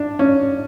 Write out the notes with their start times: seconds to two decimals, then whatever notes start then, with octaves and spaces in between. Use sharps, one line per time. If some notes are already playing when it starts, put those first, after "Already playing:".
Already playing: D4
0.19 C#4